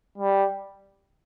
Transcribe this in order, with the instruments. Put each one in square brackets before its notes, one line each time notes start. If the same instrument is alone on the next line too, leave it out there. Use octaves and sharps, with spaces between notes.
[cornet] G3